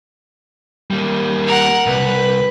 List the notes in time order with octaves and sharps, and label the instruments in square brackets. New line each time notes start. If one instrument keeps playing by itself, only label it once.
[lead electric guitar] G3 A#3
[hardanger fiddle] A#4 F#5
[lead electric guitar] C2 [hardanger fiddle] B4